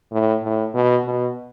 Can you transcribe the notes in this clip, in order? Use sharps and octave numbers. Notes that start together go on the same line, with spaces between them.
A2
A2
B2
B2